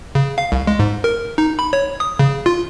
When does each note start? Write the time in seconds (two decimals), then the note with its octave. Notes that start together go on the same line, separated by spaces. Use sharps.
0.15 C#3
0.38 F5
0.52 C2
0.67 G#3
0.79 G#2
1.04 A#4
1.38 D#4
1.59 B5
1.73 C#5
2.00 D#6
2.19 C#3
2.46 F4